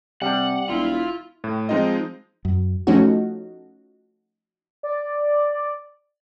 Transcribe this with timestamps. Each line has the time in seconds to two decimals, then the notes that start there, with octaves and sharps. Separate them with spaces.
0.22 C3 G3 D4 F#5
0.69 E1 E4 F4
1.44 A2
1.69 F3 G#3 C4 D#4 F4 D#5
2.45 F#2
2.87 F3 A3 C#4 D#4 F#4
4.83 D5